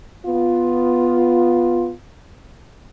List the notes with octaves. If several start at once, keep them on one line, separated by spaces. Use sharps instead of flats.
B3 F4